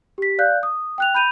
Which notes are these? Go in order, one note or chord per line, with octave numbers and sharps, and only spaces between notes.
G4 B6
D5 F5 F#6 G6
D#6
G5 F#6 F7
B5 G6 D#7 F7